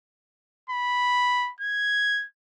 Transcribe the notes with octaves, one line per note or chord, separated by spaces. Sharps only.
B5
G#6